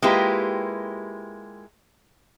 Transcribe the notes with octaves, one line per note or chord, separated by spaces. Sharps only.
G#3 A#3 E4 F4 G4 B4